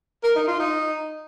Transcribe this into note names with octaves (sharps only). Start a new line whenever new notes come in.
A#4
D#4
F4
D#4